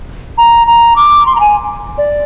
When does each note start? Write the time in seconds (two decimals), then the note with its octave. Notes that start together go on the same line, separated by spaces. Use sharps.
0.38 A#5
0.67 A#5
0.96 D6
1.26 C6
1.36 A#5
1.40 G#5
1.98 D5